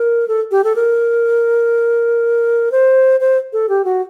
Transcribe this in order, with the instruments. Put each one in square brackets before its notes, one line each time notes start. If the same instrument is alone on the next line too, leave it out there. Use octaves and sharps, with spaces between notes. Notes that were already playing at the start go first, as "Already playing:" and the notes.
Already playing: [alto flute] A#4
A4
G4
A4
A#4
C5
C5
A4
G4
F#4